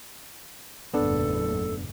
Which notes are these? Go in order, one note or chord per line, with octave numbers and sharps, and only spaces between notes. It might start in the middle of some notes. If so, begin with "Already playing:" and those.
F#1 E2 A2 B3 D4 A4